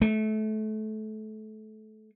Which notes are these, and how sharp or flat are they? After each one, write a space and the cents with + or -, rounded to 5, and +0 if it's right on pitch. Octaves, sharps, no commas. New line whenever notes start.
A3 -25